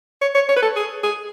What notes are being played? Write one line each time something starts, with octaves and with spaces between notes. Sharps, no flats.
C#5
C#5
C#5
B4
A4
G#4
G#4